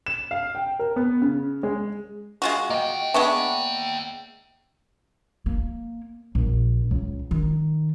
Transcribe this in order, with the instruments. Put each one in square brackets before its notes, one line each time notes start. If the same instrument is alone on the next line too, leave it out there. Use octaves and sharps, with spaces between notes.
[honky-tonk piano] E7
F5
G5
A#4
B3
C#3
G#3
[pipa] G#3 F4 F#4
[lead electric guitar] A#3 G5 [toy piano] D#5
[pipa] G#3 B3 D4 [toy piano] E5 C#6
[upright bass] A#3
A#1
C#2
D#3